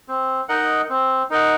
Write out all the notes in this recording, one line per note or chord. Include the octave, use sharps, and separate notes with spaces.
C4
D#4 A#4 D#5 F#5
C4
D#4 A#4 D#5 F#5